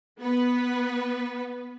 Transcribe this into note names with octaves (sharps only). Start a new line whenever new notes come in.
B3 B4